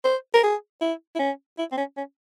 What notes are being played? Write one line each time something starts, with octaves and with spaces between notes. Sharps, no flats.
C5
A#4
G#4
E4
E4
C#4
E4
C4
C#4
C#4